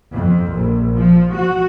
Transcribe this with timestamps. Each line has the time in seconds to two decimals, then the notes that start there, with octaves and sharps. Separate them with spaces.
0.14 F2
0.53 A#1
0.97 F3
1.34 F#4